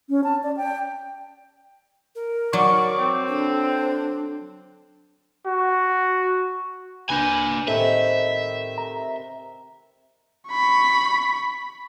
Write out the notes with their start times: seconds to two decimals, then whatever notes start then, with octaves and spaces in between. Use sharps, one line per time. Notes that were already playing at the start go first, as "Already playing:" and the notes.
0.10 C#4
0.24 A5
0.43 D5
0.57 G5
2.15 A#4
2.53 F#3 D5 C#6 D6
2.99 C4
3.28 D3 D4
5.46 F#4
7.10 C#2 A#3 D4 B4 G#5 G6
7.68 A2 C3 D#3 A4 E5
8.78 A#5
10.49 B5 C#6